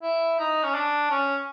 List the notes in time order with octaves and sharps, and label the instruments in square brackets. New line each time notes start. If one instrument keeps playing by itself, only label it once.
[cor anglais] E4
D#4
C#4
D4
C#4